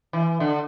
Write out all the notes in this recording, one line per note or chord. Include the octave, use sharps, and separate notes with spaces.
E3
D3